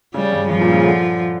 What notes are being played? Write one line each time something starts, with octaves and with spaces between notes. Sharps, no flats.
C#3 G3
G2
G2 F3
A#2
C#3
D3